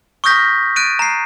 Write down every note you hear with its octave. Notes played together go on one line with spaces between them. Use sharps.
C#6 D#6 F6 G6 A#6 B6
F#6 A6 D7 D#7
A#5 C7